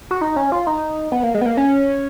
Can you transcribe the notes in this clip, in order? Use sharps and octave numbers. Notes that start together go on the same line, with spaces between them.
F#4
D#4
C#4
F4
D#4
B3
A#3
G#3
B3
A#3
C#4